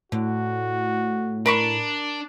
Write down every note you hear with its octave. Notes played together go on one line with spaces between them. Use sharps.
A2 D3 F#4
D4 A#4 B5 C#6